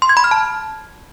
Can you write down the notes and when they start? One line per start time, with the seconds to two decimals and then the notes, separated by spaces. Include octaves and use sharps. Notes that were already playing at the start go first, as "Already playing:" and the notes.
0.02 C6
0.09 G#6
0.17 B5
0.24 F6
0.31 A5